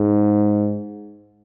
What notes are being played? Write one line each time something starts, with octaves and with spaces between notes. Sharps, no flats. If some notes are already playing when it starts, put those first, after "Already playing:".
Already playing: G#2